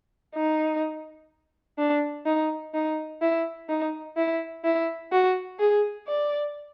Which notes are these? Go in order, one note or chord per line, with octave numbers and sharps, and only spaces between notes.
D#4
D4
D#4
D#4
E4
D#4
E4
E4
F#4
G#4
D5